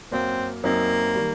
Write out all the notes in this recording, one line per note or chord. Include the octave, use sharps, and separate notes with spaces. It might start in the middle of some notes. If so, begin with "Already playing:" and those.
F#2 F#3 A#3 C4
F#2 F#3 A#3 C4 D#4
D#3 G3